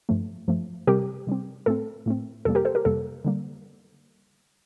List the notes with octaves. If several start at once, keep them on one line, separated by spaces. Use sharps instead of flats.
G2 F3 A3
G2 F3 A3
C3 G3 C4 G4 A#4
C3 G3 C4
A2 A3 C4 A4
A2 A3 C4
F2 C3 G3 A#3 A4
G4 A#4
A4 C5
G4 A#4
F2 C3 G3 A#3 A4
D3 G3 A#3